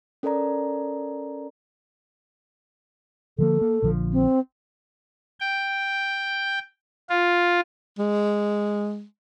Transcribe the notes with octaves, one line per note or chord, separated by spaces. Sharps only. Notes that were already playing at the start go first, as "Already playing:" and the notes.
C#4 A4 A#4 D5 A#5
D3 F3 A#3 A4
A#3
A#1 D3 F3
C4
G5
F4
G#3